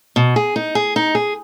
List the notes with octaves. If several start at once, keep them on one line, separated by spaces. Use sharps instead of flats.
B2
G#4
D#4
G#4
D#4
G#4